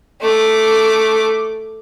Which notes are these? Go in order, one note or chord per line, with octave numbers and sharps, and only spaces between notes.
A3 D6